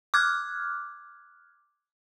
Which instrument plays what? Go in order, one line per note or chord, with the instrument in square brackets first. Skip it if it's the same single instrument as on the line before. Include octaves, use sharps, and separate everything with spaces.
[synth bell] D6 F6 F#6 G#6